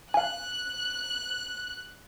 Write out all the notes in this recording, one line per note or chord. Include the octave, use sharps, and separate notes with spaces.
F5 G#5 F#6